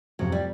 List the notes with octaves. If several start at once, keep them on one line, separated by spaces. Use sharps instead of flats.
F2 C3 F3 F#3
G3